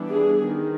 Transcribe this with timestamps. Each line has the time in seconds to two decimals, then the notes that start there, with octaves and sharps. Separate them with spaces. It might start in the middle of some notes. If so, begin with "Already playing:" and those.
Already playing: E3 G3 B3 D4
0.08 G#4
0.47 D#3